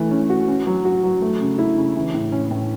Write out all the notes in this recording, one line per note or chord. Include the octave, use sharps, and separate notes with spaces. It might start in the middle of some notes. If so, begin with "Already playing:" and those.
Already playing: E3 A3
C#4
F#4
C#4
F#3
F#4
F#3
A3
C#3
E4
C#3
E3
A2
C#4
A2